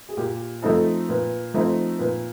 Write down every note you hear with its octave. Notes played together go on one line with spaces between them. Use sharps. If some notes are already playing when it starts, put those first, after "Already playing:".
G#4
A#2 G4
F3 A3 C4 D#4 A4
A#2 B4
F3 A3 C4 D#4
A#2 B4